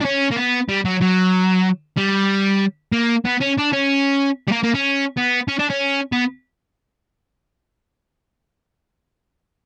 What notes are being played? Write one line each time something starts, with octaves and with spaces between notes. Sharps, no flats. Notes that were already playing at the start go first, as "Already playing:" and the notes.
D4
C#4
A#3
B3
G3
F#3
F#3
G3
A#3
B3
C#4
D4
C#4
G3
A#3
A#3
C#4
B3
C#4
D4
C#4
B3